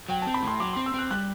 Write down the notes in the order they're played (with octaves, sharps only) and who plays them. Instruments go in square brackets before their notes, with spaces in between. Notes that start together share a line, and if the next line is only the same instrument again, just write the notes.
[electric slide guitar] F#3 [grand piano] G5
[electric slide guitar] C4 [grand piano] A5
[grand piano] B5
[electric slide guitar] A2 [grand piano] C6
[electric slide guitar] F#3 [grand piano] D6
[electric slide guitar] C4 [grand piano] C6
[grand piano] E6
[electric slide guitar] C4 [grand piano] F#6
[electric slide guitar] G3 [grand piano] F#6